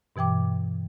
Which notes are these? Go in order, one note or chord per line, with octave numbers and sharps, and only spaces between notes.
G2 B2 E3 G5 D6